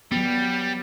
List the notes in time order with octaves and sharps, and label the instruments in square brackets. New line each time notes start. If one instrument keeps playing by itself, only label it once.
[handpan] F#3 B3 [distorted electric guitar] G3